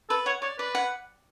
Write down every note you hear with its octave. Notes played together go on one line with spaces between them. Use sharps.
A4 B4
C#5 F#5
C#5 D5
B4 D5
F#5